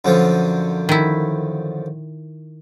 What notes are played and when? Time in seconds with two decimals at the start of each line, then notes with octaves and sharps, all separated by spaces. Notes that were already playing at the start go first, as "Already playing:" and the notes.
0.05 F#2 D3 F3
0.89 D#3 E4